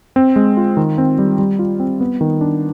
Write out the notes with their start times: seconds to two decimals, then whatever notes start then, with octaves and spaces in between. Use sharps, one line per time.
0.16 C4
0.36 G#3
0.57 F4
0.77 D#3
0.98 C4
1.18 G3
1.39 G3
1.59 F4
1.80 C4
2.01 B3
2.21 D#3
2.41 D4